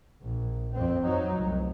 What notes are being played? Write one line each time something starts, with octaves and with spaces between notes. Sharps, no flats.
A#1
F2 C4
F#3 D#4
F1 C2